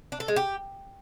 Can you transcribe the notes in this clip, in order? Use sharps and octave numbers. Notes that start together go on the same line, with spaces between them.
D4
A4
G#3
G4